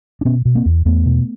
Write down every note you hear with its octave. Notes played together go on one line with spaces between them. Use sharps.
D4
B2 B3 C#4
B2
A#3 C4
E2
E2 A3 B3
B2